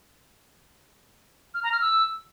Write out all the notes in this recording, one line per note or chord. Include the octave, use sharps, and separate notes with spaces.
F6
A#5
F6
E6